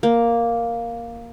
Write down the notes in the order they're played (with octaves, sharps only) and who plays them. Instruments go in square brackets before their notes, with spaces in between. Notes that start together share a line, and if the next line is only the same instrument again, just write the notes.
[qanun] A#3